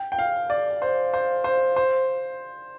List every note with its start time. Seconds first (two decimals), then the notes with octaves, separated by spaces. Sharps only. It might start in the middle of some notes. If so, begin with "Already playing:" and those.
Already playing: G5
0.12 G5
0.19 F5
0.50 D5
0.82 C5
1.13 C5
1.44 C5
1.76 C5